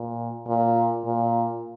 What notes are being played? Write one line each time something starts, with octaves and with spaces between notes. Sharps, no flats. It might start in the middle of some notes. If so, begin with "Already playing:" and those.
Already playing: A#2
A#2
A#2